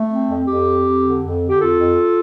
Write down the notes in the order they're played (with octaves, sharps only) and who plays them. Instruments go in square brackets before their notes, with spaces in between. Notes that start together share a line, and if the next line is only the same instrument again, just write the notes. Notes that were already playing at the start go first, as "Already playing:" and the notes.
Already playing: [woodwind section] A3
C4
F2
F2 G4
C4
F2
D3
F2
D3
G4
F2 F4 A4
F2